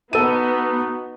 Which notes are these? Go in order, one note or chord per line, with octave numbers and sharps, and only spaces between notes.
B3 D#4 F#4 A4 D#7